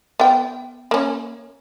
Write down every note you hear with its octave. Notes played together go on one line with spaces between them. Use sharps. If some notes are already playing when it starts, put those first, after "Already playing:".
B3 G5
A#3 C#4